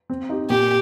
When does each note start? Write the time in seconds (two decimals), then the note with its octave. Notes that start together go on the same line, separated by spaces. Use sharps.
0.10 C4
0.29 D#4 G4
0.50 A#2 G4